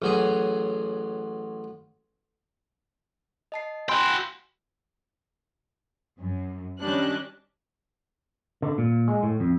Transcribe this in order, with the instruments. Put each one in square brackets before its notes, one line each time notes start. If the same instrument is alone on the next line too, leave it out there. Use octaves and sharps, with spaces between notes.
[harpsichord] A1 F#3 G#4
[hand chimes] D#5 A5 C7
[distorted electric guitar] F#4 G5 [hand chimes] G#5 B5 E6 [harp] C6
[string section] F#2
D#3 G3 C#4 D4 F#6
[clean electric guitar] D3
A#2
G#3
A2
F2